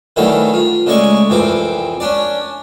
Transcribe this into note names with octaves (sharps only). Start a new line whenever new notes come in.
D#3 E3 F#3 G3 A3 A4
F4
C#3 G#3 A3 D5 C#6
C2 F2 E3 C4 D6
C#4 D4 D5